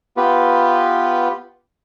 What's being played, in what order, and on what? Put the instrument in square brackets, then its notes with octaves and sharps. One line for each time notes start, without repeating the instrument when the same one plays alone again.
[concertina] B3 F4 G4 B4